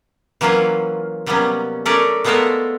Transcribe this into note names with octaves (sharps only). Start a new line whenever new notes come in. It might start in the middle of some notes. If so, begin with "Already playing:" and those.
E3 F#3 A#3 C#4 F4
C3 F#3 G3 A#3 B3 C#4
A3 C#4 A#4 D5
G#3 A3 B3 F4 A4 A#4